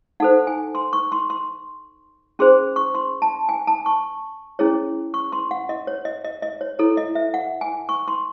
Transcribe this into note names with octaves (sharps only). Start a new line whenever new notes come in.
D#4 A4 C5 F#5
G#5
C6
C#6
C6
C6
C#4 G#4 C5 C6
C#6
C6
A5
G#5
A5
C#6
C#4 E4 G#4 C#5
C#6
C6
F#5
D#5
C#5
D#5
D#5
D#5
C#5
E4 A4 C#5
D#5
E5
F#5
G#5
C#6
C6